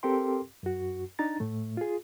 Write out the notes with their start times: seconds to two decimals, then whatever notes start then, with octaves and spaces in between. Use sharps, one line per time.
0.03 C4 G4 A4 A#4 G5 C6
0.63 F#2 F#4
1.19 D4 D#4 A#5 A6
1.40 A2 A3
1.77 F4 G#4